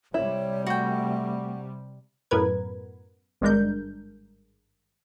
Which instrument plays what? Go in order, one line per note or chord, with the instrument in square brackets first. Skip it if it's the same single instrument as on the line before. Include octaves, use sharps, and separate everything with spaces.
[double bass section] C3 G3 [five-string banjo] E4 [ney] C#5
[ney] A3 [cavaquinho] F#4 G5
[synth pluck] F#2 A2 B3 A#4 B4 G#6
G#1 G2 G#3 D4 A#4 G6